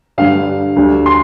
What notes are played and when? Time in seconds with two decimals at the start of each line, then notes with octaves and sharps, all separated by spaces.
0.18 G2 D3 G3 F5
0.76 D2 D3 G3
1.06 C6